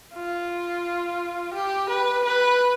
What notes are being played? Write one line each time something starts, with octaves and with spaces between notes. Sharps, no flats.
F4
G4
B4
B4